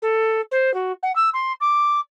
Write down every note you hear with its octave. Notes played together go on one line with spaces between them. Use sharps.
A4
C5
F#4
F#5
E6
C6
D6